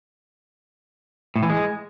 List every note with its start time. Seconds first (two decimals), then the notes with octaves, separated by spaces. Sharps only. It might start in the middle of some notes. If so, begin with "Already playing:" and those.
1.36 A2
1.43 E3
1.50 G#3